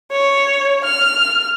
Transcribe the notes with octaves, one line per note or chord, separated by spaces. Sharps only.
C#5
F6